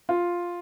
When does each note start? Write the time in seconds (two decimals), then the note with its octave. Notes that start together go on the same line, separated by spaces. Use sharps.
0.09 F4